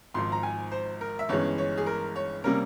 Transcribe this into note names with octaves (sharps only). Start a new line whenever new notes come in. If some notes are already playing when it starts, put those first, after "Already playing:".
G#1 G#2 F3 C6
A#5
G#5
C5
A#4
E5
G1 G2 E3 G#3 C#4 C#5
C#5
G#4
A#4
C#5
C3 G3 A#3 C#4 A#4